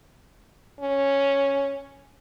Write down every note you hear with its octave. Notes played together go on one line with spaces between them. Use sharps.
C#4